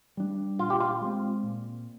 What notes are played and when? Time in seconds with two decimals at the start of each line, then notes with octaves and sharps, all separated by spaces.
0.17 G3 D4
0.59 A#2 F4
0.70 G4
0.80 F4
1.01 G#3 C4
1.43 A#2